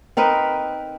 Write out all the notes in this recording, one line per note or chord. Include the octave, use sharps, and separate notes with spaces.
C4 D#4 A#4 B4